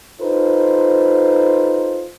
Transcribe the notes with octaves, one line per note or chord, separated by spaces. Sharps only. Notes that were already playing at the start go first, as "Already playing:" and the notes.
D#4 F4 A4 B4 C5